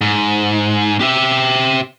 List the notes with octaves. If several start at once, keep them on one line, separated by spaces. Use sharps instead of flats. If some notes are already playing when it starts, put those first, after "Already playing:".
G#2
G4 E5